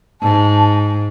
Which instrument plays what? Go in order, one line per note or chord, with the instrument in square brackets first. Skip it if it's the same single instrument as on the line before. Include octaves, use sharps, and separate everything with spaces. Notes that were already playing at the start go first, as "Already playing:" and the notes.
[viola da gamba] G#2 [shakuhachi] A5